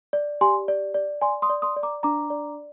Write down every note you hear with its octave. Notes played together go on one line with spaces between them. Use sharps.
D5
G4 G#5 C6
D5
D5
D5 G#5 C6
C6 D#6
D5
C6 D#6
D5
A#5 D6
D4 A#5 D6
D5